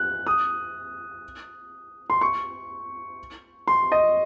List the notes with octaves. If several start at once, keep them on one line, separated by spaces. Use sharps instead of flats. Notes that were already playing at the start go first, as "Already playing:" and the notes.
Already playing: F#6
D#6
C6
C#6
C6
D#5